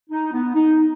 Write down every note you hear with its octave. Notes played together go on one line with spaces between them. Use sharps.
D#4
B3
D#4